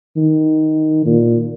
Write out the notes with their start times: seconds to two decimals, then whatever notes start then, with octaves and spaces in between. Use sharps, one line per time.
0.17 D#3
1.06 A#2